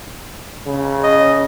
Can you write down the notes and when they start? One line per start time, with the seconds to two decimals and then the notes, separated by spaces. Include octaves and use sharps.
0.67 C#3
1.03 D#5